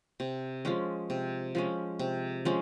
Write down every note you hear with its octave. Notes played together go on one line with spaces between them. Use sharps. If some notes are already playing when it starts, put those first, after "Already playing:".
C3
F3 G#3 C#4
C3
F3 G#3 C#4
C3
F3 G#3 C#4